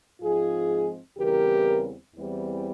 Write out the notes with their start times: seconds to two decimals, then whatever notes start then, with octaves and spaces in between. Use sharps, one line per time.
0.21 G#2 F3 G#3 C4 F4 G#4
1.17 E2 C#3 E3 G3 C4 G4 A#4
2.14 E2 E3 G3 C4